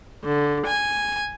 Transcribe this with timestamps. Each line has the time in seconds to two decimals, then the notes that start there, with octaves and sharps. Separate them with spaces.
0.24 D3
0.66 G#5